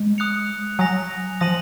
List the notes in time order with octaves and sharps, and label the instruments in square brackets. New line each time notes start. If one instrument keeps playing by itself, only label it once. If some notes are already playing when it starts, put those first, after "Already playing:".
Already playing: [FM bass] G#3
[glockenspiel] D#6 F#6 C#7 F7
[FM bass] F#3 [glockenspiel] G#5 D#6 A#6 F7
[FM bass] F3 [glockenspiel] D#6 A#6 D#7 F#7